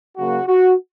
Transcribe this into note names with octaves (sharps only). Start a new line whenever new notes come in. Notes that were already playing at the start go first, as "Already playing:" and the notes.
C#3 F#3 A#3 F#4
F#4